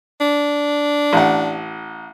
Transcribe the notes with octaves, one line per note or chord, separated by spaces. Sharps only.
D4
A1 F#5